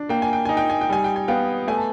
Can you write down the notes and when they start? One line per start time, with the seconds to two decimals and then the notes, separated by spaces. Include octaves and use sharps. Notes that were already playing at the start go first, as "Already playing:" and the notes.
Already playing: D4
0.09 A#3 G5
0.22 G#5
0.33 G5
0.45 D#4 G#5
0.57 G5
0.70 G#5
0.81 G5
0.89 G3 G#5
1.04 G5
1.16 G#5
1.28 B3 F5 G5
1.68 A3 G#5
1.77 A5